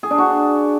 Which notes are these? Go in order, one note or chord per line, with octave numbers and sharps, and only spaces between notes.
G#4
D4
F#4